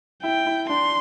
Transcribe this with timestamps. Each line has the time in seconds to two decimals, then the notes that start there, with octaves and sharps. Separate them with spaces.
0.23 E4 G5
0.47 E4
0.69 D4 C6